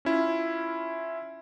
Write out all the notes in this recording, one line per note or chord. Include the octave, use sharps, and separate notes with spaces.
C#4 E4 F4